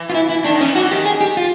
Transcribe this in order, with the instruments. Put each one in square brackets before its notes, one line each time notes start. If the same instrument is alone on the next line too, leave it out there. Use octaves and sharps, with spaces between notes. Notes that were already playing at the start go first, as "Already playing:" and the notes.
Already playing: [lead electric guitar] E3
[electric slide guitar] F4
E4
E4
[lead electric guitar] D#3 [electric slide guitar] D4
[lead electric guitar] D#3
[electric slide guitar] C#4
[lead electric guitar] E3
[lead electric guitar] E3 [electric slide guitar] F#4
[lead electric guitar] D#3 [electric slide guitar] G4
[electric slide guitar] G#4
G4
F4